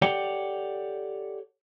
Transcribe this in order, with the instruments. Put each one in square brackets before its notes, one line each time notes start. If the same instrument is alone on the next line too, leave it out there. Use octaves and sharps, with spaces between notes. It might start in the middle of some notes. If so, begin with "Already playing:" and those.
[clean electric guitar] G4 A4 C#5 D5 F#5 G5